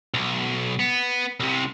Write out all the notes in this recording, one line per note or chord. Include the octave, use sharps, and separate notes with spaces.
B1
B3
C2 C3